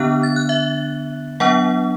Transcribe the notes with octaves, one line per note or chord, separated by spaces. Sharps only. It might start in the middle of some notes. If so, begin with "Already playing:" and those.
Already playing: D3 B3 D4 F#6
A6
F#6
E5
F#3 B3 D4 F#5